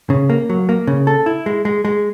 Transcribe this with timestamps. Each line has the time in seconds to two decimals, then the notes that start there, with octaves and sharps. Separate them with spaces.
0.10 C#3
0.30 A#3
0.49 F#3
0.69 A#3
0.87 C#3
1.07 A4
1.26 E4
1.46 G#3
1.65 G#3
1.85 G#3